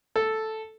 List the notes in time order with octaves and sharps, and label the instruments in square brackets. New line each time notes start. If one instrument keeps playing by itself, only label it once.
[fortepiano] A4